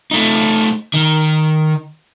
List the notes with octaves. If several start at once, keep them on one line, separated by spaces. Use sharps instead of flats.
A3 D#4
D#3